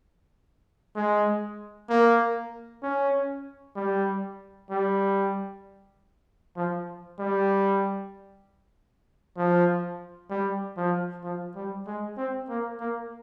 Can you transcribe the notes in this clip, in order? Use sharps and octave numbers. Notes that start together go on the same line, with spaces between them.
G#3
A#3
C#4
G3
G3
F3
G3
F3
G3
F3
F3
G3
G#3
C4
A#3
A#3